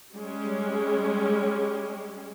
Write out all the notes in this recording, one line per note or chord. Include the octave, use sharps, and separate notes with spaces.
G3 G#3 C#4